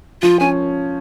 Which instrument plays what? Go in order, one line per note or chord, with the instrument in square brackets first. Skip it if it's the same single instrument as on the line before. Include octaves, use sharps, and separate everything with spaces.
[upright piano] F3 [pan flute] F4
[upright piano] C#4 [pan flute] G#5